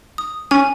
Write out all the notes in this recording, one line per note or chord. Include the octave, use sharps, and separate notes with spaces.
D#6
C#4 G#5